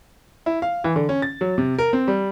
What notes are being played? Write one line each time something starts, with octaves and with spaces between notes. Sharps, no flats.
E4
F5
E3
D3
C#4
A6
F#3
C3
A#4
C4
G3